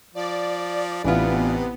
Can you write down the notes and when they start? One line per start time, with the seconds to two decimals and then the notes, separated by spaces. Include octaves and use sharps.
0.15 F3 D5
1.04 A1 C3 B3 D4 E4 F4